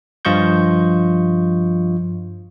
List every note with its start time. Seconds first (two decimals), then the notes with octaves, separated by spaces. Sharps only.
0.25 G2 F3 F4 D#5 C#6 G6